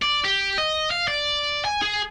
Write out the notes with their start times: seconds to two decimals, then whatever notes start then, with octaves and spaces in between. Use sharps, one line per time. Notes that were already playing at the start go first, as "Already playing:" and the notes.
0.02 D5
0.24 G4
0.58 D#5
0.91 F5
1.08 D5
1.65 G#5
1.82 G#4